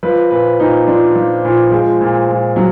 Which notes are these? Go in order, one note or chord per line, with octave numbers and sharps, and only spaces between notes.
F3 B4
A#2 B4
A#2 D#4
F3 D4
F3
A#2
F3 G#3
A#2
A#2
F#3